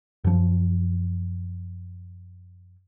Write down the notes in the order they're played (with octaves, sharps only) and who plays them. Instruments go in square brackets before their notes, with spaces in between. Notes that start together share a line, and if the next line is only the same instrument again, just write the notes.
[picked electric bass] F#2 F3